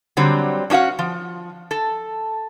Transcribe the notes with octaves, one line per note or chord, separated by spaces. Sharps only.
D3 F#3 G3 C4
C#4 D4 F#4 F5 F#5
F3
A4